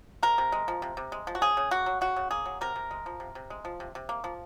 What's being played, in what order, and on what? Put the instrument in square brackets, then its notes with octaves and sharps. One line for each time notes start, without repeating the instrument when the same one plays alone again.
[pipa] C3 A#4
C3
G#3
F3
C3
C3
G#3
F3
F#4
C#3 G#4
C#3
A#3 F#4
F#3
C#3 F#4
C#3
A#3 G#4
F#3
C3 A#4
C3
G#3
F3
C3
C3
G#3
F3
C3
C3
A#3
F3